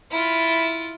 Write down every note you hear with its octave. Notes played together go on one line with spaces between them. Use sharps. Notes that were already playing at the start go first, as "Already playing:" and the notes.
E4 F4